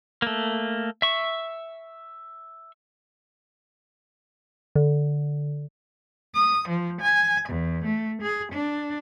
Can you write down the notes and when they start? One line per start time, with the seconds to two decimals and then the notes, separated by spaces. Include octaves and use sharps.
0.22 A3 A#3
1.02 E5 C#6
4.76 D3
6.34 D#6
6.69 F3
7.01 G#5
7.49 E2
7.83 A3
8.22 G#4
8.52 D4